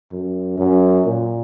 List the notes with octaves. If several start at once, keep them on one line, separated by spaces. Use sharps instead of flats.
F#2
F#2
A#2